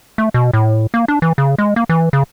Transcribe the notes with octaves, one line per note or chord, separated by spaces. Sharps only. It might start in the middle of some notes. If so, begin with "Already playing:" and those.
A3
B2
A2
A#3
D4
E3
C#3
G#3
A#3
E3
C#3